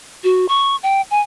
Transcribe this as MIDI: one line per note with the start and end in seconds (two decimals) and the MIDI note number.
0.24 0.46 66
0.49 0.76 85
0.83 1.02 79
1.11 1.21 80